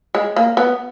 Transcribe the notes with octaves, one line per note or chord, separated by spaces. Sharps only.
G#3
A#3
B3